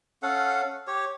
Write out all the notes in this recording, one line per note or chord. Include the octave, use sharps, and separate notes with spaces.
C#4 A4 F5 F#5
G4 C#5